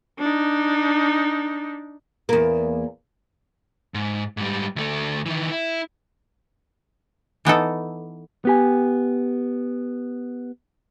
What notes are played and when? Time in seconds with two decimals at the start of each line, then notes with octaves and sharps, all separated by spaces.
0.19 D4 D#4
2.29 E2 A#3
3.94 G#2
4.37 G#2 G3
4.76 D2 A3
5.26 D#3 E3
5.52 E4
7.45 E3 B3 D#4 A4
8.45 B3 G4 G#5